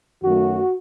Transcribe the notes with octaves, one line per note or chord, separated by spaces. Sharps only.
F#2 D#3 F#3 A3 F#4